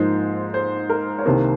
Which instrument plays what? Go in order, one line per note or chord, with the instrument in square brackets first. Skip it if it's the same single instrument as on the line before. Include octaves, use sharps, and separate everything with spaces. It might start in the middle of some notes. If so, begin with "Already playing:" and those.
Already playing: [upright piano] G#2 F3 A#3 D#4 C5
C5
A#4
C#5
C2 C3 D#3 A#3 C5